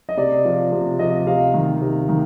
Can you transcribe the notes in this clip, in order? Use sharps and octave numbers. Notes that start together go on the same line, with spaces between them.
D#5
C3 D5
F3
C3
F3 D#5
C3 F5
D#3
C3
D#3